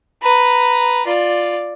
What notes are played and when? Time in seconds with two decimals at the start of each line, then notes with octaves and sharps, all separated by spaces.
0.22 B4 A#5
1.06 F4 D5